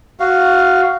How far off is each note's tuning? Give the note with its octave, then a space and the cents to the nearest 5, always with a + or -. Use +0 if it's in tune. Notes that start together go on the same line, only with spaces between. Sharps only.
F#4 +0 F5 -5